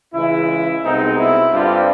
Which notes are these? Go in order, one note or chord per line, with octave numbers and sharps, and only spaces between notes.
C#2 C#3 E3 G#3 E4
C2 B2 G#3 C4 D#4
E4
G2 D3 G3 C4 F4